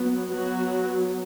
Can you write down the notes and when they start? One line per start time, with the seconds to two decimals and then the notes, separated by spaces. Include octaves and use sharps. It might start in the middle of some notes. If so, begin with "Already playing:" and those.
Already playing: F#3 B3
0.31 F#3 B3 F#4